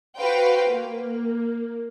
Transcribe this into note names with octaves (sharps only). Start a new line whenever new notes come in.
F#4 B4 C5 F5 G5
A#3